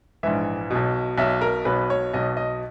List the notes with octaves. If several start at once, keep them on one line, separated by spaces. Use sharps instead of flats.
A#1 G#2 E3 E5
B1 B2
B1 B2 E5
A#4
B1 B2 B4
C#5
B1 B2 D#5
D#5